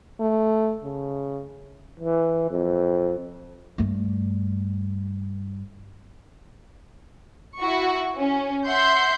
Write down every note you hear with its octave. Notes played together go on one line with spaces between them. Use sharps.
A3
C#3
E3
F2
G2 A3
E4 F#4 C#6
C#4
E5 F#5 C6 G6